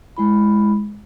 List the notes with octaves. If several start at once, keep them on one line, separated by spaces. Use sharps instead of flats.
G#3 E4 B5